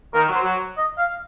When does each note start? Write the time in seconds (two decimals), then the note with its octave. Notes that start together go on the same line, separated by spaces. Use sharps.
0.14 D#3 A#4
0.28 F#3
0.35 C5
0.42 F#3
0.77 D#5
0.98 F5